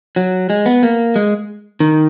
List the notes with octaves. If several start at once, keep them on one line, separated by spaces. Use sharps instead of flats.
F#3
G#3
B3
A#3
G#3
D#3